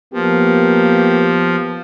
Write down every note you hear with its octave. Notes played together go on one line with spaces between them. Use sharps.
F3 A#3 B3 G4